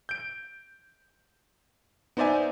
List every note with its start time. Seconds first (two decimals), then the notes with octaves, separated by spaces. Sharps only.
0.09 G6 D7
2.17 B3 D#4 C5 D5 E5 G#5